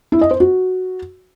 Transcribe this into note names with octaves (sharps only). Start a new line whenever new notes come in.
E4
D#5
C5
F#4